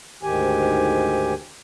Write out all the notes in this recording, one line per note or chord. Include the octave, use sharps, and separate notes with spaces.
D2 G#2 D#3 G4 G#5